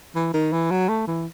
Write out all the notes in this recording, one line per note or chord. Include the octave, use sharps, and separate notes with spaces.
E3
D#3
E3
F#3
A3
E3